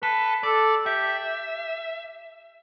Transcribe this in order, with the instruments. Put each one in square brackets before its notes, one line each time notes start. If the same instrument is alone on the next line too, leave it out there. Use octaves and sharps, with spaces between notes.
[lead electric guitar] A4 [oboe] B4
[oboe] A4 [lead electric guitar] D5
[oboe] G4 [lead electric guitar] E5